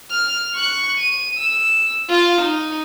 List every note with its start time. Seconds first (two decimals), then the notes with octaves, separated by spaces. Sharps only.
0.11 F6
0.55 C#6 F#6
0.98 D#7
1.38 E6
2.09 F4 F5
2.41 D#4